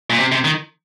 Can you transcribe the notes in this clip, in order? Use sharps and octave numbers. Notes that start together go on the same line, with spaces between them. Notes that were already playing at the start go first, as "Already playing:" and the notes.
A#2
C3
C3
D#3